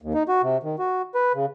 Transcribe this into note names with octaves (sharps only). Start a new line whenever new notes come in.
D#2
D#4
F#4
C3
D#3
F#4
B4
C#3